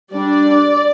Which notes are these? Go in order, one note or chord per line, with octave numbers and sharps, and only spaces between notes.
G3 D4 D5